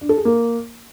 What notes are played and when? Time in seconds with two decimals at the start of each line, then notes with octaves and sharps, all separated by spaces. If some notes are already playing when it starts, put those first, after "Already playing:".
0.01 D4
0.09 A4
0.17 G#4
0.25 A#3